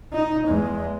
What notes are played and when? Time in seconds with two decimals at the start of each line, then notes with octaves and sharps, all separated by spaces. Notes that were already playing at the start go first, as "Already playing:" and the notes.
0.13 D#4
0.47 E2 G#3